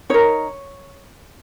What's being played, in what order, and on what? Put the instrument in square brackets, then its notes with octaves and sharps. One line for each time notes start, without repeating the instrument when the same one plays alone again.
[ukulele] D#4 A#4 C#5